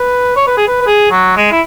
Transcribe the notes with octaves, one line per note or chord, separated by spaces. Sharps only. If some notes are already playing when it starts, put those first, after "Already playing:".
Already playing: B4
C#5
B4
G#4
B4
B4
G#4
F#3
G#3
E4